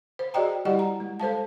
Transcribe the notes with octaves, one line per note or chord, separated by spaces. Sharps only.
C5
F#4 G#4 D5 D#5 G5 A#5
G3 E4 G4 D5 D#5 F#5
A#5
G#3
A4 C5 F5 A5